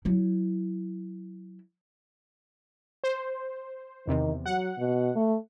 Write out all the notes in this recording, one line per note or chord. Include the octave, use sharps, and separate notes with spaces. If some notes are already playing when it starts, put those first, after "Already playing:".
F#3 E4
C5
E2 C3 D#3
F#3 F#5
B2
A3